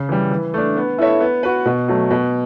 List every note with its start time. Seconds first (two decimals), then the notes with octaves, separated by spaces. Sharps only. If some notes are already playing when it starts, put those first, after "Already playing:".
Already playing: C#3
0.09 E3 G3
0.31 E3
0.54 A3 D4
0.76 B3
0.98 E4 A4 C#5 E5
1.20 B3
1.43 F#4 B4
1.65 B2
1.88 F#3 A3
2.10 B2